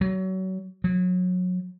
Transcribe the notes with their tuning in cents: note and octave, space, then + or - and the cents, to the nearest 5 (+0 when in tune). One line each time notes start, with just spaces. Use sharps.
F#3 +30
F#3 -30